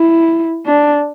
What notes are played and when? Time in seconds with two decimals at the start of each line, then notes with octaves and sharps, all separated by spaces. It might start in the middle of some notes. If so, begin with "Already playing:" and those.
Already playing: E4
0.66 D4